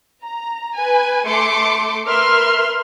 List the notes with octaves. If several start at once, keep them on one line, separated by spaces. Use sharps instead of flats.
A#5
B4 G#5
A3 C6 D6 C#7
A#4 B4 E5 C6 F6